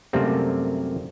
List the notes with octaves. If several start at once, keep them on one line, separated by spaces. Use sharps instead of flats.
F#2 C3 G3 A3 A#3 C4